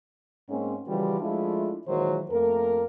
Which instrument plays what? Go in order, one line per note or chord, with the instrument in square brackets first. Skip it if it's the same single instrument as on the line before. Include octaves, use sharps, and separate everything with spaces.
[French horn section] G#2 A#3 C4 C#4
C#3 E3 F3 G3 F#4 G4
F3 G#3 A3 D4 E4 F4
A#2 D#3 E3 F#3 G#3 C5
F2 A3 A#3 A#4